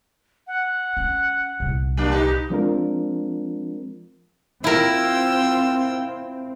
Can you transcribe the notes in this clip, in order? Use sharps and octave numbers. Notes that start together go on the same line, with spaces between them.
F#5
C#4
C2 A#2
F#3 A#3 D4
D#4 G4 B4
F3 G#3 C4 D4 F4 A#4
C4 E4 F4 A#4 G5 E6